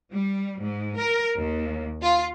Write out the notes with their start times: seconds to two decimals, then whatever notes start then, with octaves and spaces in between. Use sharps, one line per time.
0.12 G3
0.62 G#2
0.99 A#4
1.38 D#2
2.02 F4